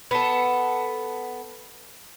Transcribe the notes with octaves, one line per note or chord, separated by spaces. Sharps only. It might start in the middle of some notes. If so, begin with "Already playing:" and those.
B3 A4